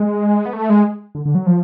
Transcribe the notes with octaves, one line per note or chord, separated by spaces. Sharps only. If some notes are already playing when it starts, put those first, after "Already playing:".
Already playing: G#3
B3
A3
G#3
D3
D3
F#3
F3